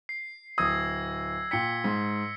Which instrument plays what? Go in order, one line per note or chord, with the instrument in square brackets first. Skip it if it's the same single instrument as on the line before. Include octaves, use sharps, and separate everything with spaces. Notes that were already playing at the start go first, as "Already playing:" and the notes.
[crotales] C7
[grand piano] D1 D#6 [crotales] E6 G#6 A#6
[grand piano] A#2 G5 [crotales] B6 C#7 G7
[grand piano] G#2